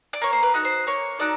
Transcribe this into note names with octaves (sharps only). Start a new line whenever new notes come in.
D5
A#3 C#5
C5
B4
D#4 F#4 A4
C5
A#3 C#5
D#4 F#4 A4 D5